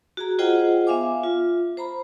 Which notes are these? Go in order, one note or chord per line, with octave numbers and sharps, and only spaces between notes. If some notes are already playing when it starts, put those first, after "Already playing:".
F#4 G#4 A#5
F4 G#4 C5 D#5 F#5 G5
B3 E5 F5 G#5 D6
F4
C5 A#5 B5